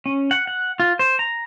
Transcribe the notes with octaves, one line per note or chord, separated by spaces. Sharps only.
C#4
F#5
F#5
F4
C5
A#5